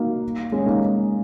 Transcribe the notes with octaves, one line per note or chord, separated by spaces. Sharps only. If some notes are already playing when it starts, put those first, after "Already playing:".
Already playing: A#3 D#4 F#4
G#3 C#4
A#3 D#4